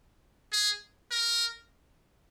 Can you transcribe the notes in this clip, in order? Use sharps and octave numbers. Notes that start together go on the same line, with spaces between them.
G#4
A#4